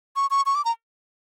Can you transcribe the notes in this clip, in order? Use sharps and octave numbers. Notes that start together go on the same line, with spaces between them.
C#6
C#6
C#6
D6
A#5